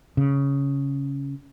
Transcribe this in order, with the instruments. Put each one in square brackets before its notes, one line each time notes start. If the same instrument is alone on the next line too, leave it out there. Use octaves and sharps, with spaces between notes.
[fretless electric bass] C#3